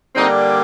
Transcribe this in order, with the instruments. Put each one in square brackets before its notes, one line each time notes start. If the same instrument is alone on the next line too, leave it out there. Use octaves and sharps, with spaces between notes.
[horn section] D3 G3 A#3 C4 D#4